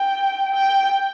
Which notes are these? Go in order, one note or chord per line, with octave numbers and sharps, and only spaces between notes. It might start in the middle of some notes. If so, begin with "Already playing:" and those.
Already playing: G5
G5